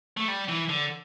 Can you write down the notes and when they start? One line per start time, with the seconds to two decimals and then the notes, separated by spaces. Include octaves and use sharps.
0.17 A3
0.28 G3
0.49 E3
0.69 D3